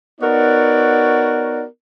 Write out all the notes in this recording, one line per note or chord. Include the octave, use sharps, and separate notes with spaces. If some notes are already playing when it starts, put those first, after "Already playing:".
B3 D#4 F#4 A#4 C#5 D5